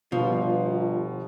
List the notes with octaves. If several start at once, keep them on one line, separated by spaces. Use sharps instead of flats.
G1 B2 F3 F4